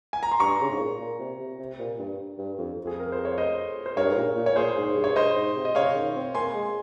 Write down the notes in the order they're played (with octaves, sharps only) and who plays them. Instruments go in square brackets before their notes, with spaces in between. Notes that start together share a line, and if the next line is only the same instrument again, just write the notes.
[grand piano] G#5
A#5
C6
[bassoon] G2 [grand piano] A#5 C#6
[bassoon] C#3
G#2
A#2
A#2
C3
C3
C3
A#2
G2
G2
F2
[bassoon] F2 [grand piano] G#4
[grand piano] A#4
C5
C#5
C5 D#5
C5
[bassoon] G2 [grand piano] A#4 C#5
[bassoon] G#2
A#2
A#2
[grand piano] C#5
[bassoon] A#2 [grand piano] G#4 C5
[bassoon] G#2
G2
[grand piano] C#5
C5 D#5
[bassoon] G#2
C3
[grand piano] D#5
[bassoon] C#3 [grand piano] C#5 F5
[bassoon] D#3
C4
[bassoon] A#3 [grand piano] G#5 C6
[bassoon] G#3